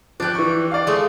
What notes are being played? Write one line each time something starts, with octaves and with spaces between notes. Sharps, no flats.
F3 D4 G4 F#6
E3 C#6
D5 F5
G#3 A3